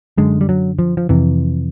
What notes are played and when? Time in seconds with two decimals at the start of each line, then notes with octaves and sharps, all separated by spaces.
0.18 F#2 D3 G#3
0.41 G3
0.49 F#3
0.79 F3
0.97 F3
1.09 F2 C3 E3